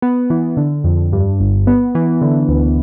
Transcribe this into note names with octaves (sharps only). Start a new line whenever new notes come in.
B3
E3
D3
F2
G2
G1
B3
E3
D3
D2